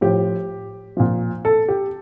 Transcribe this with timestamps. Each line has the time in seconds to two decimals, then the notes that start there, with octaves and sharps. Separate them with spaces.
0.01 A2 F3 G4
0.97 A#2 F3
1.45 A4
1.68 G4